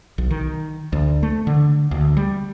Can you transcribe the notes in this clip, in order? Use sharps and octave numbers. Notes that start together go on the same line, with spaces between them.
B1
D#3
D2
A3
D3
D2
G3